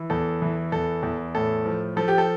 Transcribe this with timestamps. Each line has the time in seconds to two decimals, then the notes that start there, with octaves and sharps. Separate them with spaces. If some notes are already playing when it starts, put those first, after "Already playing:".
Already playing: E3
0.10 E2 A4
0.42 E3
0.72 E2 A4
1.03 E2
1.35 A2 A4
1.65 F3
1.97 F3 A4
2.08 G4
2.18 A4